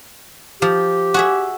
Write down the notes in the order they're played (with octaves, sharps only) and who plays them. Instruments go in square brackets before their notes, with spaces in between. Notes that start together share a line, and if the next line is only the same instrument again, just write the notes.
[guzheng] F3 [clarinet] G4
[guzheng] F#4 G#4 E5